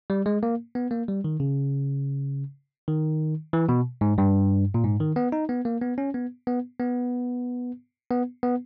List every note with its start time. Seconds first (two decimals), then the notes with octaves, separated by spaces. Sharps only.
0.10 G3
0.26 G#3
0.43 A#3
0.75 B3
0.91 A#3
1.08 G3
1.24 D#3
1.40 C#3
2.88 D#3
3.53 E3
3.69 B2
4.01 G#2
4.18 G2
4.74 A#2
4.84 G#2
5.00 D#3
5.16 B3
5.32 D#4
5.49 B3
5.65 A#3
5.82 B3
5.98 C#4
6.14 B3
6.47 B3
6.79 B3
8.11 B3
8.43 B3